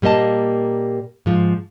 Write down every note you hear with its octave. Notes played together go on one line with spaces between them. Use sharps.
A#2 G3 A#3 D#5 A5
G#2 F3